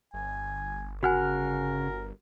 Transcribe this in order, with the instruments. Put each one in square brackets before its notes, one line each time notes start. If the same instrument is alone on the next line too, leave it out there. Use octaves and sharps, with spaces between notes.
[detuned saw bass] G1 [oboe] G#5
[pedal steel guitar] C#3 F6 F#6 [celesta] F#4 F#5 G#5 [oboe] A#4